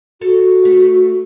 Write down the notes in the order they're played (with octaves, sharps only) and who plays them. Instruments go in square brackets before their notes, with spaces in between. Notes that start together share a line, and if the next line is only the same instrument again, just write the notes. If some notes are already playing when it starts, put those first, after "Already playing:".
[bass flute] F#4 [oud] A4
[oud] A3